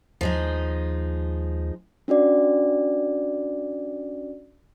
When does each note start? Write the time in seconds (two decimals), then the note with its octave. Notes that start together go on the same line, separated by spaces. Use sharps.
0.21 D#2 F3 G#3 D#4
2.08 C#4 D4 F#4 D5